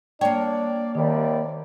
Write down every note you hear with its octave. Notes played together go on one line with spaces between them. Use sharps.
A#3 D4 C#5 D5 G5
D#2 C3 D#3 G3 D5